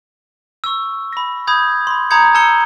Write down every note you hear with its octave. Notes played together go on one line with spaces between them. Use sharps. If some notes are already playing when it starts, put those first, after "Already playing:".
C#6 E6
B5 A#6
B5 D#6 G6 G#6
B5 C6
A#5 B5 D#6 G6 G#6 C#7
A5 A#5 E6 G6 C#7 G7